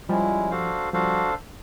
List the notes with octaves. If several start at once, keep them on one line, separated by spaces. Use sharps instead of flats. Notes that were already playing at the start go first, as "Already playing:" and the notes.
F3 G3 G#3 C#4 E4
D4 F#4 A4 C5 F5
F3 G3 D4 F#4 A4 C5 F5